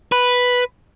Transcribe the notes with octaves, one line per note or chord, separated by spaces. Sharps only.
B4